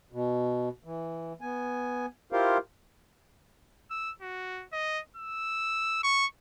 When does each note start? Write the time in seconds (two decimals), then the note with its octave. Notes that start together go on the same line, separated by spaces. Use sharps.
0.12 B2
0.84 E3
1.41 B3 G#5
2.32 E4 F4 G4 A#4 C5 F5
3.91 E6
4.21 F#4
4.72 D#5
5.17 E6
6.03 C#6